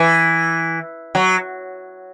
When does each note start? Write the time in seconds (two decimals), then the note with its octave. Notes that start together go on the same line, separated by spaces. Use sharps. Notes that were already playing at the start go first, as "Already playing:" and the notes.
Already playing: E3
1.15 F#3